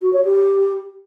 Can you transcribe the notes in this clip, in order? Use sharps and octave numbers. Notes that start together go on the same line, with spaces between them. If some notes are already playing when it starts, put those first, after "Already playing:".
F#4
C#5
G4